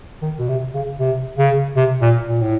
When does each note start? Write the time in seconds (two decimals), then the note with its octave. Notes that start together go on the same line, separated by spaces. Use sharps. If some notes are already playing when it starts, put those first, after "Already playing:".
0.22 D#3
0.39 B2
0.48 C3
0.74 C#3
0.99 C3
1.38 C#3
1.76 C3
2.02 A#2
2.27 A#2
2.41 A2